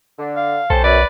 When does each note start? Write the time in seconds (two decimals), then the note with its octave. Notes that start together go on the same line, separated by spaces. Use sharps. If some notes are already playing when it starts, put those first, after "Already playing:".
0.19 D3
0.36 F5
0.70 B1 C#4 G4 A4 C5
0.84 F#2 B4 D5